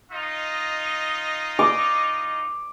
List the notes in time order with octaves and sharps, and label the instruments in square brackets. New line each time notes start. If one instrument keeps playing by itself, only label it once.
[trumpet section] D#4 F4 D#5
[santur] D6